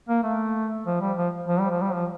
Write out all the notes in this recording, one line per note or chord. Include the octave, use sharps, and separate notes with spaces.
A#3
A3
F3
G3
F3
F3
G3
F3
G3
F3